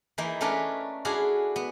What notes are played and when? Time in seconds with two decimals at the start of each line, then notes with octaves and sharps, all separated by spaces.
0.18 E3 A#3 D#4 E4
0.41 A3 C#4 D4 A#4 B4
1.05 D4 E4 F#4 G#4 F5
1.56 B3